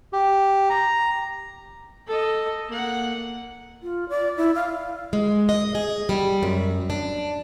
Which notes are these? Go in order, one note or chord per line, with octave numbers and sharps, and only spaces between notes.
G4
A#5
A4 D#5
A#3 F#5
F4
D5
E4
F5
G#3
D#5
G#4
G3
F#2
D4